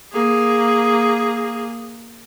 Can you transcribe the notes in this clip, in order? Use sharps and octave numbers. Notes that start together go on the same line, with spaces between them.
A#3 G#4